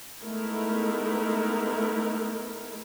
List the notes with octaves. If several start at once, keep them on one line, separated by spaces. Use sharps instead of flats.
G#3 A3 B3 D#4 E4 A#4